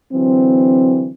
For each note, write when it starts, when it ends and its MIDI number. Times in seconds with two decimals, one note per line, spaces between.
0.13 1.11 50
0.13 1.11 52
0.13 1.11 54
0.13 1.11 60